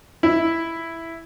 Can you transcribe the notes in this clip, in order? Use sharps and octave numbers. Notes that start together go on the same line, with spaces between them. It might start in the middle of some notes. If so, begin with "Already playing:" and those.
E4